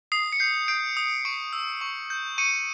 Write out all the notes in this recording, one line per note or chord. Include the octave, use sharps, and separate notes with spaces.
D#6 C7
C#7
G6 C7
G6 C7 D7
D#6
C#6 C7 D7
E6
C#6
G6
C#6 C#7 D#7